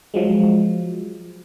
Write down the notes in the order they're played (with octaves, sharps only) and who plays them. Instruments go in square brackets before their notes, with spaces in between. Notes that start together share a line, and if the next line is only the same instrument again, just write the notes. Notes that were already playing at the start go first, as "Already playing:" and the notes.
[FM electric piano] F3 F#3 G#3